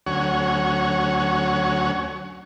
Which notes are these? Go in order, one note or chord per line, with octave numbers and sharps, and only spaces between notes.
D2 F#3 C#4 C#5 F#5 G#5